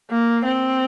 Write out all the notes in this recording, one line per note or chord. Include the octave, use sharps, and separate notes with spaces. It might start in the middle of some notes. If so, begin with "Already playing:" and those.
A#3
C4